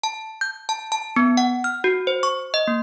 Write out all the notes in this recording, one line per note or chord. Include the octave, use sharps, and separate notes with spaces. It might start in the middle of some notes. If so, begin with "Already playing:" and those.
A5
G6
A5
A5
B3
F#5
F6
F#4
C5
C#6
D#5
A#3